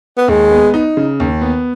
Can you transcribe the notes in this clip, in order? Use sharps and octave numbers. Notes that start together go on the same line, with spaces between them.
B3
D#2 G#3
B3
D#4
C#3
D#2
B3